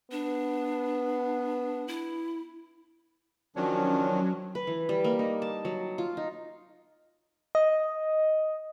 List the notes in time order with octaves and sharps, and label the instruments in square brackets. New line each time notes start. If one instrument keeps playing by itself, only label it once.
[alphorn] B3 [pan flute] D4
[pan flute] E4
[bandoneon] D#3 F3 D4 [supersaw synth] F#3 C#4
[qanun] B4
E3
G3
A#3
D#4
A5
F#3
F4
D#4
[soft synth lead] D#5